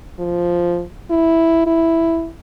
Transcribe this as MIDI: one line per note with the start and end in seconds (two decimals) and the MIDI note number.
0.19 0.83 53
1.11 1.66 64
1.66 2.29 64